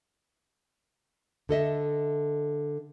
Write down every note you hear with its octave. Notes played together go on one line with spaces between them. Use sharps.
D3 A4 D#5 E5